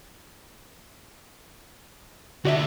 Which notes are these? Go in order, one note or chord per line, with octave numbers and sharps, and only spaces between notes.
D2 F#4 D5 E5